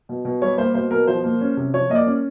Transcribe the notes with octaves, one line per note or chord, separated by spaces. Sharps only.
B2
B2
G3 C#5
A#3 C5
B2 C5
B2 A#4
F3 C5
A#3
C#4
C3
F3 C#5
A#3 D#5
D5
C#4